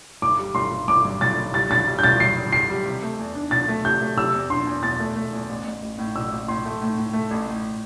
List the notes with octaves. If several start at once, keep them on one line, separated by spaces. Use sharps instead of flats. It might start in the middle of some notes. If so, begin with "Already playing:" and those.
G1 D6
G3
G1 C6
G1
G1 D6
G2
G1 A6
G1
G3 A6
G1 A6
G3
G6
G1 A6
G2 C7
G2
G3 C7
G3
C3
A3
E2
D4
E2 A6
A3
C3 G6
A3
C3 E6
E2
D4 C6
E2
E2 A6
A3
A3
E2
A1
A1
A1
A2
A1 E6
A1
A2 C6
A3
A2
A2
A3
A1
A2